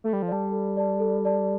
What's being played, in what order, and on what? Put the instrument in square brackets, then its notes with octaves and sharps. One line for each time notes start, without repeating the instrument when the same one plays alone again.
[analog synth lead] A3 [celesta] A4
[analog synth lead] G3
F3
[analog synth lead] G3 [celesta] D5 A5
[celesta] A4
D5 A5
A4
D5 A5